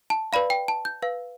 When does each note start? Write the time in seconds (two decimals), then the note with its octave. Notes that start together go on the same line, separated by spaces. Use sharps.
0.10 A5
0.33 B4 D5 F5 B5
0.50 G5
0.68 A5
0.85 G6
1.02 B4 F5